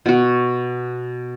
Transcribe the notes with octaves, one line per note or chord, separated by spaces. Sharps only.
B2 F#4